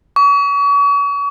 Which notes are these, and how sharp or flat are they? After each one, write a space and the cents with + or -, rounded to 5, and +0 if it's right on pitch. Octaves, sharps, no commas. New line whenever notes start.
C#6 +40